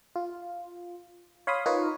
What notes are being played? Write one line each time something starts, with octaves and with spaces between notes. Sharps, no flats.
F4
C#5 F5 B5 C6 D#6
D#4 F4 A#4 B4 C#5 D#5